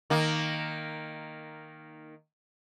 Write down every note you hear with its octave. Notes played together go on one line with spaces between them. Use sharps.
D#3 A#3